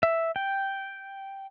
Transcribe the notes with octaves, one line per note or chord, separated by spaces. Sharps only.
E5
G5